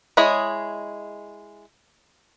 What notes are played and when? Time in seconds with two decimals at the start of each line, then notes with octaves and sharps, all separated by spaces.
0.17 G#3 E4 G#4 C#5 D#5